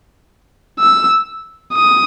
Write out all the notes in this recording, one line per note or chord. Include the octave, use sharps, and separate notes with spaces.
E6
D#6